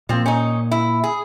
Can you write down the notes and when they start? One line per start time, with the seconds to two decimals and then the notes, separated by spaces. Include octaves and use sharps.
0.09 A#2 F3 A#3 C4
0.26 C#4 D#4
0.71 E4
1.04 G#4